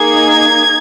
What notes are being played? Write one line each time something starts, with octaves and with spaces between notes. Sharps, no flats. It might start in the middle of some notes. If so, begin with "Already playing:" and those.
Already playing: A#3 D#4 G#4 G#6